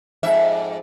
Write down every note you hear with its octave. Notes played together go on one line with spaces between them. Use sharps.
F2 G#2 E5